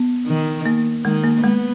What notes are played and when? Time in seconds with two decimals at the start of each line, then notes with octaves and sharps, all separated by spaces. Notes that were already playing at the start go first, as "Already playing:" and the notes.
Already playing: B3
0.27 D#3
0.66 A#3
1.05 D#3 G#3
1.24 A#3
1.44 G#3 B3